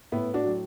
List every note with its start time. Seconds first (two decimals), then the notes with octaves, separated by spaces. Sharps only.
0.12 A2 B3 E4
0.34 D4 F#4
0.44 F#3